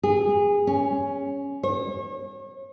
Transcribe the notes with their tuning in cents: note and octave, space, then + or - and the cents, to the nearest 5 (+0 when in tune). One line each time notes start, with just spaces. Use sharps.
G#4 -25
C#4 +5
C#5 -35